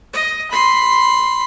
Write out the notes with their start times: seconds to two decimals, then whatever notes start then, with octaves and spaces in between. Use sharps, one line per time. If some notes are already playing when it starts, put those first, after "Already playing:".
0.13 D#5
0.51 B5 C6